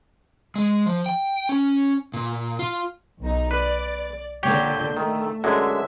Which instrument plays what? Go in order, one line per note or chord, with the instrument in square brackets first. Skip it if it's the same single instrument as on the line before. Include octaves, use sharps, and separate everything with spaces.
[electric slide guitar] G#3
F3
G5
C#4
A#2
F4
[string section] B1 D#4
[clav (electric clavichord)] B4 [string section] D5
[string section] A#2 D3 G6 [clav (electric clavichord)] G4 C#5 G5
[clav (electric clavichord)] D#3 [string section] A3
[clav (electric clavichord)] F#2 D3 G#3 [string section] E5